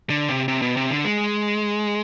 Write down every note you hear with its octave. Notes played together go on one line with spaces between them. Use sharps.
D3
C3
C3
B2
C3
D3
G#3